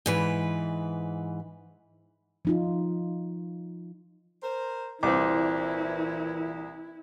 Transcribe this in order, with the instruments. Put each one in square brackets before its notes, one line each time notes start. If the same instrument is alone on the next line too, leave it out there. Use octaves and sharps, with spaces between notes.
[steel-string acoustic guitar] G#2 E3 B4
[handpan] F3 D#4 F4
[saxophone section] A#4 C5
[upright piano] C2 [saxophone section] A#2 E3 [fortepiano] C4 D6 [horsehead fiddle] E4